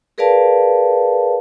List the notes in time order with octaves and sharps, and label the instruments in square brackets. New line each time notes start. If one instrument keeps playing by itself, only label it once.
[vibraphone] G#4 A#4 B4 D5 F5 A5